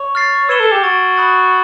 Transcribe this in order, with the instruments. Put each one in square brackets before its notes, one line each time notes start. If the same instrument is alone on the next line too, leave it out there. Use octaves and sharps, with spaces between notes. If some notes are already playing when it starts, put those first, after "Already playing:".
Already playing: [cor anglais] C#5
[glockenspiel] F6 A6 C7
[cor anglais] B4 [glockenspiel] E6 G#6 C#7 E7 G7
[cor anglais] A4
G4
[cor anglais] F#4 [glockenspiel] E6 A6 D7
[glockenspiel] B5 D#6 F#6 A6